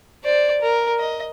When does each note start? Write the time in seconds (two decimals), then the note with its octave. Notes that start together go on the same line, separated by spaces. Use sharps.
0.24 C5 D5
0.61 A#4
0.99 D#5